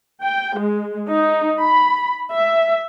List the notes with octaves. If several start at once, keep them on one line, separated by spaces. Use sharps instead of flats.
G5
G#3
D#4
B5
E5